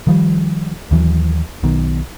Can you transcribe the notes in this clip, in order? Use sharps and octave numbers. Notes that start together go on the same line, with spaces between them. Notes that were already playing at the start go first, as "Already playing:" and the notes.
D#3 F3 G3
D#2 E3 F#3
B1 B2 D#3